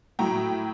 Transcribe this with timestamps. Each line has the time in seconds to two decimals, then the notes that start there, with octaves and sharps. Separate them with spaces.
0.19 A2 F#3 G5 A#5